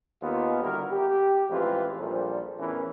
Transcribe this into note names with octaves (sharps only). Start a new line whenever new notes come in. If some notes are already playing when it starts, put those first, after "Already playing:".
D#2 B3 F4
D3 G3 E4 F#4 A#4
G4
A1 F2 E3 G#3 F4 B4
A#1 A#2 G3 A4 C5
E2 A2 E3 C#4 A#4 B4